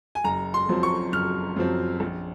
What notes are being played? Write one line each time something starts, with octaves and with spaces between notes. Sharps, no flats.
G#5
F#1 A#5
C6
F#2 F3 C4
C#6
F#1 F6
F#2 F3 C4
A#1